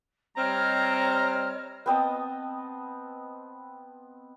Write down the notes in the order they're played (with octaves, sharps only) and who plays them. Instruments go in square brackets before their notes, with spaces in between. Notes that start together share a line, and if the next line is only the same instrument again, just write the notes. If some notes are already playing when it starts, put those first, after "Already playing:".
[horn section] G3 C4 [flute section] C#5 D#5 F6 [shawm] A#5
[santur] B3 C4 D#5 A5